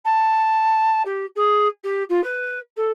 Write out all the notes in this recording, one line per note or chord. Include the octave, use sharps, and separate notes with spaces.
A5
G4
G#4
G4
F4
B4
A4